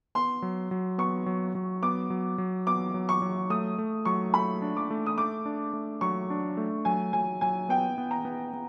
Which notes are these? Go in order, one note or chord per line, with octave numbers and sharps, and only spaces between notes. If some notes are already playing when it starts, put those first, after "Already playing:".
B3 C6
F#3
F#3
B3 C#6
F#3
F#3
B3 D6
F#3
F#3
B3 D6
F#3
C#6
F#3
A3 D#6
A3
F#3 C#6
A3 B5
D4
D6
A3
D#6
A3 D6
D4
A3
F#3 C#6
D4
A3
F#3 G#5
F#3 G#5
F#3 G#5
B3 G5
B3
A#5
B3
B3